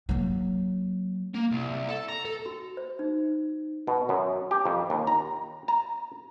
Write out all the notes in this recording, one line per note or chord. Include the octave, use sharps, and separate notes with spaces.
F#3 A#3
A#3
C2
A4
A#5
A4
F#4
C5
D#4
B2
F#2
G4
F2
D#2
A#5
A#5